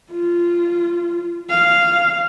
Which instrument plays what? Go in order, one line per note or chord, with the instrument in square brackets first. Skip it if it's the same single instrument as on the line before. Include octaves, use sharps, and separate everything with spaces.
[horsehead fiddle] F4
F5